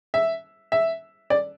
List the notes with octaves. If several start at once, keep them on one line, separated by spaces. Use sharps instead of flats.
E5
E5
D5